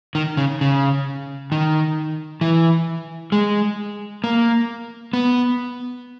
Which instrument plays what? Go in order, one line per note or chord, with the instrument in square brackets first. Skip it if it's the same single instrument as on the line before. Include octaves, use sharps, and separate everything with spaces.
[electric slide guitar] D#3
C#3
C#3
D#3
E3
G#3
A#3
B3